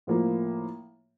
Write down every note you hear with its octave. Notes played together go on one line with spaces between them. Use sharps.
A2 F3 A#3